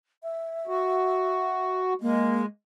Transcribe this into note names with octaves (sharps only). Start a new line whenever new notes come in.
E5
F#4
G#3 A#3